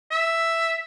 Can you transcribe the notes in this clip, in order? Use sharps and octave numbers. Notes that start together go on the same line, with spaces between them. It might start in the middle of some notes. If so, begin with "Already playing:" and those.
E5